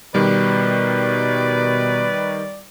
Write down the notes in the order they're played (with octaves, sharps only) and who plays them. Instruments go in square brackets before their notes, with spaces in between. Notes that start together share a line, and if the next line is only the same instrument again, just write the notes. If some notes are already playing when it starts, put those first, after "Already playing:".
[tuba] B2 [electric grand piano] D#3 G3 [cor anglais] B4 [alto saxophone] D5